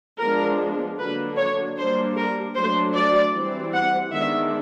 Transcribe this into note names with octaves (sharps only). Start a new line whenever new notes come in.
F3 G#3 B3 D4 A#4
D3 F#3 A#3 D4 B4
C#5
G3 A#3 D4 C5
A#4
F#3 A3 D4 C5
D5
E3 G3 C4
F#5
D#3 G#3 B3 D4 E5